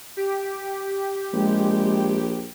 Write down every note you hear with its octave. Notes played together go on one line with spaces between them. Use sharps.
G4
A#1 G#3